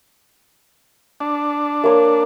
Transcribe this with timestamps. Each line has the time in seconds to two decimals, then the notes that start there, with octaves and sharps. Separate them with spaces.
1.20 D4
1.84 A#3 C#5